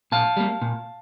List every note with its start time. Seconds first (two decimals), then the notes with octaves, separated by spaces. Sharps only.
0.12 A#2 F5 A5
0.37 G3 A#3
0.62 A#2